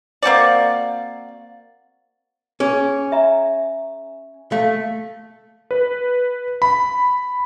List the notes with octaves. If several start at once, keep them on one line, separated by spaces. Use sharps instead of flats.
A#3 C4 F#4 D5
C#4 G#4
E5 A#5
A3 F5
B4
B5